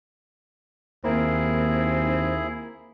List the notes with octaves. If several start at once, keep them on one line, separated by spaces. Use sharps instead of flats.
D#2 A#3 C4 E4 G#4